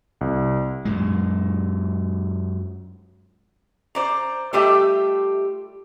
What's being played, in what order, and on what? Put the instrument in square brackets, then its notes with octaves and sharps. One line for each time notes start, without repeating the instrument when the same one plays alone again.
[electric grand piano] C2
[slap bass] F#2 A#2 G#3
[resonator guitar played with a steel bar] C5 D5 A#5
G3 A3 F4 G4 D#5 E5